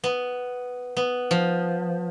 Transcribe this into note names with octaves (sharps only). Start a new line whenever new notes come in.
B3
B3
F3